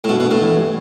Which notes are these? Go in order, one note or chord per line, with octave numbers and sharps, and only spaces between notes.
A2
G2 B2
B2
B3
A2
E3
G3